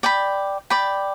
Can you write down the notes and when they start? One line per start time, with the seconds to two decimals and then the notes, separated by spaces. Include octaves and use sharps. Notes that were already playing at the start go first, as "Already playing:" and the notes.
0.03 D5 G5 B5
0.70 D5 G5 B5